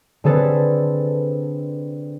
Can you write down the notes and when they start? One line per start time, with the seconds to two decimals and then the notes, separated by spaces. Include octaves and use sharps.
0.24 D3 C4 G#4 A4 B4